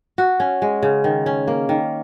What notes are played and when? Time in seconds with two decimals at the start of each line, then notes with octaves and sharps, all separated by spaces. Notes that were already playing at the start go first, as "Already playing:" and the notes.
0.18 F#4
0.40 C#4
0.62 G#3
0.83 C#3
1.04 D#3
1.26 C#4
1.48 A#3
1.69 D#3